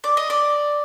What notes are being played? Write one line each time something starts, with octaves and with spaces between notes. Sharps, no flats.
D5
D#5
D5